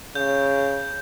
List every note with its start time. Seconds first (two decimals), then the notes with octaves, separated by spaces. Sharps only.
0.15 C#3 G6